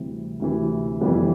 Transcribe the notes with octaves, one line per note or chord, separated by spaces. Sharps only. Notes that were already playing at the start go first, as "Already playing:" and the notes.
Already playing: D2 C3 E3 G3
D2 C3 E3
F1 F2 E3 G3 B3